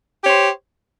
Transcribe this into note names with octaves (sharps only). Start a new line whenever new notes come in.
G4 C5 C#5